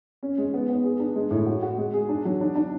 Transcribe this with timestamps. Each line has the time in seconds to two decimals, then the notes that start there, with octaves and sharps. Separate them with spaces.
0.23 C#4
0.38 G#3
0.54 B3
0.69 B3
0.84 G#4
1.00 D4
1.16 G#3
1.31 A2
1.46 F#4
1.63 F#4
1.78 G#3
1.94 G#4
2.09 D4
2.25 F#3
2.41 D4
2.56 D4